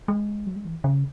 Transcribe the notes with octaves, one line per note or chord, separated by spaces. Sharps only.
G#3
F#3
G#3
E3
C#3